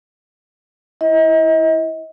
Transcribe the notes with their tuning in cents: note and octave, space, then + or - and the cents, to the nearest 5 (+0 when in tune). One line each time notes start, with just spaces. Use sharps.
E4 +0 D#5 +35